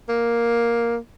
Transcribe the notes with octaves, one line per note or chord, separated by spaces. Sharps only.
A#3